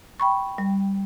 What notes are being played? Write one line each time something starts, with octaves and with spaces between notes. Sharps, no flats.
G5 B5 C#6
G3